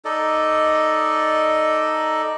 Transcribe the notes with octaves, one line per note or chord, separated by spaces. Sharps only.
D#4 A4 D5 D#5